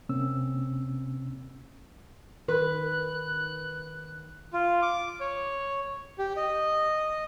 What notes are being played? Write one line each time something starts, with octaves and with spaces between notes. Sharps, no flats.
C3 A#3 C4 C#4 E6
D#3 B4 F#6
F4
D6
C#5
G4
D#5